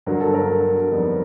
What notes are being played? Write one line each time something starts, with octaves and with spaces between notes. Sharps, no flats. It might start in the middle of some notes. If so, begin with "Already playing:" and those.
G2 D3 F#3 A#4
A4
A#4
F2 D3 G3 B3 D#4